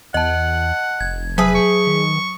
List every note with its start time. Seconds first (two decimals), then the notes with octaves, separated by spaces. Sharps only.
0.14 E2 D#5 F#5 A5
1.01 F1 G#6
1.38 F#3 G#4 B4 E5 D#6
1.55 C#6
1.87 D#3